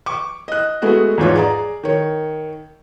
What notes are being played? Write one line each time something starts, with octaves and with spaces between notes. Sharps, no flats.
C#6 D6
D#5 F#6
G#3 A3 B3 F#4
E2 G#2 F4 C#5
G#4 D5 A#5
D#3 C#5